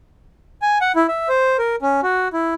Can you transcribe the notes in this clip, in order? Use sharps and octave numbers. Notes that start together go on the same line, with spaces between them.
G#5
F#5
E4
E5
C5
A#4
C#4
F#4
E4